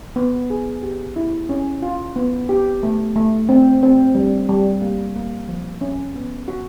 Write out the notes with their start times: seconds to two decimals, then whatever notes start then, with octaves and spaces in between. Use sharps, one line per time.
0.16 B3
0.50 G#4
0.83 G4
1.16 E4
1.49 C#4
1.82 F4
2.16 B3
2.49 G4
2.83 A3
3.16 A3
3.49 C4
3.83 C4
4.15 G3
4.49 G3
4.81 A#3
5.16 A#3
5.48 F3
5.81 C#4
6.15 B3
6.48 F#4